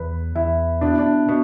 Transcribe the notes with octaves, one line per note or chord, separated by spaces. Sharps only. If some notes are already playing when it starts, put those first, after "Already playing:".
Already playing: E2 B4
E2 E4
B2 D4
E4
D4
B2